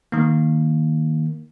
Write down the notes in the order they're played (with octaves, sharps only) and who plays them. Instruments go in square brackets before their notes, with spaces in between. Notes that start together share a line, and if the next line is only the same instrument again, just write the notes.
[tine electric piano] D#3 A#3